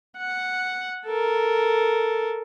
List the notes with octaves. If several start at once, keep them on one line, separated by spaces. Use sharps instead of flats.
F#5
A4 A#4